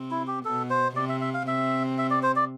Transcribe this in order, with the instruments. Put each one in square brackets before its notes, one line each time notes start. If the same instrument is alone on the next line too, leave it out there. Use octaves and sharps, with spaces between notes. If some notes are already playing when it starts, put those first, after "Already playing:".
Already playing: [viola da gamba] C3 C4
[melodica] E4
G4
[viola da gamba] B2 B3 [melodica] A4
[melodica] C5
[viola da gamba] C3 C4 [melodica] D5
[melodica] E5
E5
F5
[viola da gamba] C3 C4 [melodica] E5
[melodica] E5
D5
C5
D5